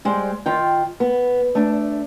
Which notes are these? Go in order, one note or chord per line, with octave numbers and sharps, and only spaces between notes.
G3 G#3 C5
D#3 F4 G5
B3
A3 D4